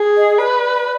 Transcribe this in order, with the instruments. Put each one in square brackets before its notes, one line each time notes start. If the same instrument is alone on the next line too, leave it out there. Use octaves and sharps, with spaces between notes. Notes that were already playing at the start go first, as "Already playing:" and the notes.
Already playing: [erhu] G#4
[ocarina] D#5
[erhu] B4 [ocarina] D5